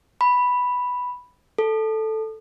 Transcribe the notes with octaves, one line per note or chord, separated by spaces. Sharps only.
B5
A4